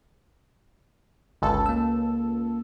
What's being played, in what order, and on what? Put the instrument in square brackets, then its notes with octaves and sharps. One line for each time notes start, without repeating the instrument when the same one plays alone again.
[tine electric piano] G1 [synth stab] C#2 A4
[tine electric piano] A#3 E6